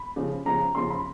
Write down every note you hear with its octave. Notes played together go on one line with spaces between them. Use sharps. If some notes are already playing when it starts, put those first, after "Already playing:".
Already playing: B5
C#3 F3
C#3 F3 A#5
C#3 F3 C6
B5